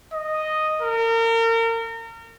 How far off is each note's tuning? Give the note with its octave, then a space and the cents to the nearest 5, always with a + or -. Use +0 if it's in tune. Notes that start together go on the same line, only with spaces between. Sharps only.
D#5 -5
A#4 -35